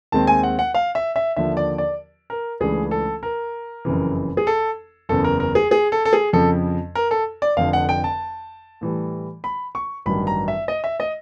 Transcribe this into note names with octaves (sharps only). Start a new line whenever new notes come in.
D#2 D#3 G#3 C4 A5
G#5
F#5
F#5
F5
E5
E5
D#2 D3 F3 E5
D5
D5
A#4
C#2 C#3 E3 A3 D4 G#4
A4
A#4
F#1 F2 C#3 E3
G#4
A4
F#1 E2 C#3 A4
A#4
A#4
G#4
G#4
A4
A4
G#4
F2 C#3 F3 A4
A#4
A4
D5
F1 F2 D3 F5
F#5
G5
A5
A2 E3 G3
B5
C#6
A1 G2 D#3 F#3 B5
A#5
E5
D#5
E5
D#5